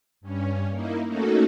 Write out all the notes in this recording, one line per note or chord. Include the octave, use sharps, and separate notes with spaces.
G2 C#4
A#3 D#4 E4
A3 A#3 C#4 D#4 F#4 A4